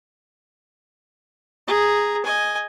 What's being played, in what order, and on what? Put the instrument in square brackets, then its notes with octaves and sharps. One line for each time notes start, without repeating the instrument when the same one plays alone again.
[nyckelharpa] G#4 A#5
D#5 G#5